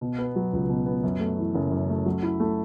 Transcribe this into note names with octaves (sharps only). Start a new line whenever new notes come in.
B2
B3
F#3
C#2
B2
B3
F#2
A3
E3
F#1
F#2
A3
F#3
E4
A3